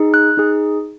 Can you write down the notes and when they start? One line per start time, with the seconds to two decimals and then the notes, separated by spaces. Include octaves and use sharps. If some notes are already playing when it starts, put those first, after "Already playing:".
Already playing: D#4 G#4
0.14 F#6
0.37 D#4 G#4